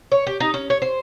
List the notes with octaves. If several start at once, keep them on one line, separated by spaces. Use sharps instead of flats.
C#5
G4
D#4
C#4
C#5
C5